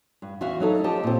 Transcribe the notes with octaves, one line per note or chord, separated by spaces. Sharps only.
G2
E2 F#4 E5 F5
F#3 D#4 A4 C#5
F3 G4 D#5 A5
A#2 C4